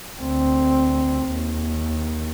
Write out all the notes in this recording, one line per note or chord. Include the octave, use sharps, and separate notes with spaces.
D2 C4
D#2